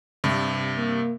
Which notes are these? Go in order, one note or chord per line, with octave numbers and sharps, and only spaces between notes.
G2 C3
A#3